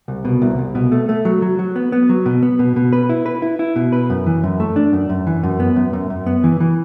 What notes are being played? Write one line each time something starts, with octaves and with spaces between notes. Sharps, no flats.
C2
B2
C2
C2
B2
A3
A3
F#3
F#3
F#3
B3
B3
F#3
B2
B3
B2
B2
B4
E4
B4
E4
E4
B2
B4
F#2
E3
F#2
A3
D4
F#2
F#2
E3
F#2
B3
F#2
F#2
F#2
B3
E3
E3